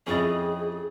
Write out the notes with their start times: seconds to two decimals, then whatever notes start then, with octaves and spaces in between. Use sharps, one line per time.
0.07 F2 C#4 E4 G#4 D#5 A6